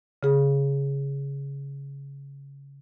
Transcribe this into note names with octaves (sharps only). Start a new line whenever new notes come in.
C#3 G#4